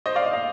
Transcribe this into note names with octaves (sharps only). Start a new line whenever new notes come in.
C5 D#5
D5 F5
D#5
F5